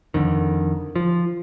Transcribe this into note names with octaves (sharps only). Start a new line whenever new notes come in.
F2 D3 D#3
F3